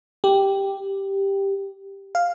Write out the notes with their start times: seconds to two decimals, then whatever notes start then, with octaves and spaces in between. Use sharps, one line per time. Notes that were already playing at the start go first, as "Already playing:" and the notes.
0.24 G4
2.15 F5